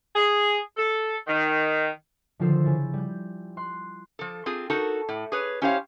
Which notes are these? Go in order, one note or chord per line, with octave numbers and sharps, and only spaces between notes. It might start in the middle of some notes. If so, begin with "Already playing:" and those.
G#4
A4
D#3
D3 D#3 F3 F4 C5 E6
C#3 E4 A6
G3 G6
C6 F#6 C7
F3 A4
C4 F4 G#4
D#4 F#4 A4 A#4
A2
G#4 B4 C#5
C#4 E4 G4 C5 C#5 F5